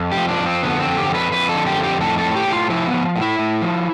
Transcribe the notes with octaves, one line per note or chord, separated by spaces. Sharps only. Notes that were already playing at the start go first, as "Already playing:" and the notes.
Already playing: F2
G4
F3
D4
F2
C4
D3 B3
C4
F2
G4
F2
B4
F2 B4
A4
D3
G4
F2
G4
A2 A4
A4
A2
G4
A2
F4
F3 E4
B3
F3
A2
E4
A2
F3